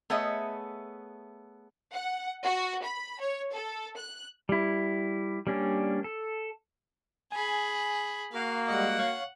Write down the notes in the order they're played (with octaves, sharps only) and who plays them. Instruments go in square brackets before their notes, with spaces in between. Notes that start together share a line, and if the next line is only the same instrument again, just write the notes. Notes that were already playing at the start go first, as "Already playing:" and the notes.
[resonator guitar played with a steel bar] A3 B3 G#4 C#5 D#5 E5
[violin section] F#5
F#4
B5
C#5
A4
F#6
[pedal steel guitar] G3 E4
G3 A#3 C#4 D4
A4
[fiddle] G#4 B5 [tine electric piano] G#5
[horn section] A#3 F#4 [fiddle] F5
[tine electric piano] G3 G#3 D#5 [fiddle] F#5
[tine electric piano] C#5 F5 C#6